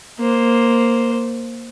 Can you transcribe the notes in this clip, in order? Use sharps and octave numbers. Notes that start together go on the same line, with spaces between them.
A#3 C5